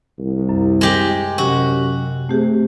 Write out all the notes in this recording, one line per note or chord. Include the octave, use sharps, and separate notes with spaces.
C2
F#2
G#3 G4
F#2 C3 F#4 G4
C3 A3 G4 G#4